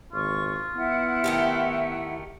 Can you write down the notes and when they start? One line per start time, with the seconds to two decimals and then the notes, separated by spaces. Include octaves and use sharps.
0.13 G#1 F4 C#6
0.75 B3 E4 F#5
1.24 D#3 A3 G4